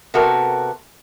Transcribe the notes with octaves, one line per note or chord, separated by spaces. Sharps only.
C3 B3 F#4 A4 A#4